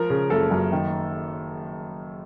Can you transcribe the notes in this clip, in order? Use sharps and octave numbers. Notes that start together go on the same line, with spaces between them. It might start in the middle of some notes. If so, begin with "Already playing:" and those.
Already playing: F3 A#4
C#3
F#1 A4
F#2
D#3